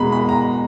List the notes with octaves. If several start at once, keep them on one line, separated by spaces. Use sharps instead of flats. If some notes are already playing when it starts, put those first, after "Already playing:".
Already playing: E2 B2 G#3 A#5 B5
B5
A#5